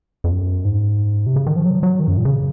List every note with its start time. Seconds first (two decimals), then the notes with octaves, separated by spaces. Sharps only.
0.24 F2
0.31 F#2
0.65 G#2
1.26 C3
1.36 C#3
1.46 D#3
1.56 F3
1.66 F#3
1.83 F#3
2.00 D#3
2.08 F#2
2.17 A#2
2.25 C#3